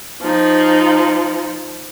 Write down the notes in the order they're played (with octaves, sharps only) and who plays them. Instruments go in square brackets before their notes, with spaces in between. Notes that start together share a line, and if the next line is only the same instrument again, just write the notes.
[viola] F3 D#4